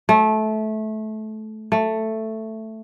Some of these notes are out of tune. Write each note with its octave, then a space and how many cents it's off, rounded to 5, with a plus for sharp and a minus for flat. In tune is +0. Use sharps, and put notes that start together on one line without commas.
A3 -20
A3 +5